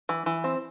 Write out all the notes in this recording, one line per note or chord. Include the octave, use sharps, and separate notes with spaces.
E3
E3
C4